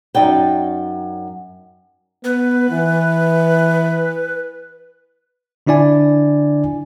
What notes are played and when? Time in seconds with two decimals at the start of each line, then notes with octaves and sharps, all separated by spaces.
0.15 F#2 D#4 D5 G5
2.24 B3 B4
2.70 E3
5.67 D3 D4 E4 D5 G#5